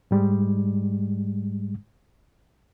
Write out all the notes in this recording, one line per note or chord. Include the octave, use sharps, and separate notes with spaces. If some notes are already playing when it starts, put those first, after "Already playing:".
G#2 G3 G#3